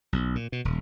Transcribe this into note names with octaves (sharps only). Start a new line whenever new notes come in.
B1
A#2
B2
D#1